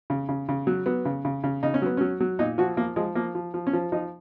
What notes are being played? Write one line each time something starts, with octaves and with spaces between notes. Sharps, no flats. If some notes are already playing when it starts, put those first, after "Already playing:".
C#3
C#3
C#3
F#3
F#3 B3
C#3
C#3
C#3
C#3 D#4
C#4
F#3 B3
F#3 C#4
F#3
A#2 D#4
F3 F#4
F3 A#3
F3 G#3
F3 A#3
F3
F3
C#4
F3
F3 D#4